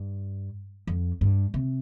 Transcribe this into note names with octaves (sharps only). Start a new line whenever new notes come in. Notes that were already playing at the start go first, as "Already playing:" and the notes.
Already playing: G2
F2
G2
C3